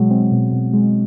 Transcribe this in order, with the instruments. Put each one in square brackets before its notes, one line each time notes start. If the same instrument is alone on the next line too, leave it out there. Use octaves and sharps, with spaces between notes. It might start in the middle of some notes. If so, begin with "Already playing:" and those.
Already playing: [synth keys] B2 G#3 [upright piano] F#3
[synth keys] C4
B2
B2
G#3